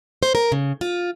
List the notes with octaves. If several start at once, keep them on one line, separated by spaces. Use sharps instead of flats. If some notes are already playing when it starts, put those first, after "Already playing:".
C5
A#4
C#3
F4